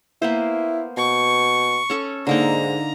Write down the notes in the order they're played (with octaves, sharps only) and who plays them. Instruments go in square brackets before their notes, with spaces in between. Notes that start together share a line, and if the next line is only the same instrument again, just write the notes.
[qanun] A#3 B3 C5 [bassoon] E4
[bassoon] B2 [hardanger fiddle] C#6
[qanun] C#4 A4 C#6
[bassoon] G#2 [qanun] D3 A#3 D#4 [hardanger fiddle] A#5